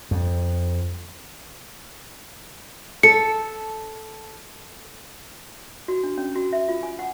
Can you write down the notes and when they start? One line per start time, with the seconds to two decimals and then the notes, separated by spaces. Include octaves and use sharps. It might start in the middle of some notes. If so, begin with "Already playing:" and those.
0.11 F2
3.03 A4 C#7
5.88 F#4
6.03 D4
6.18 C#4
6.36 F#4
6.53 E5
6.69 F4
6.83 G#5
6.99 F#5